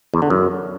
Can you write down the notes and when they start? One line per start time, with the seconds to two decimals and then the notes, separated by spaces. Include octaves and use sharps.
0.14 E2
0.22 D3
0.30 F#2